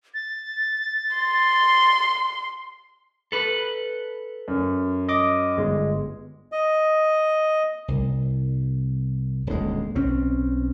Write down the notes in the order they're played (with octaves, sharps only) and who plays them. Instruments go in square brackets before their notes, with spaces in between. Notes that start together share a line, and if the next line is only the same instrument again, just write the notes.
[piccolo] A6
[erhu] C6
[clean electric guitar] A4 B4
[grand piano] F#2
[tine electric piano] D#5 D6
G1 G#3
[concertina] D#5
[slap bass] C2
D#1 D2 G#3
B1 C4 C#4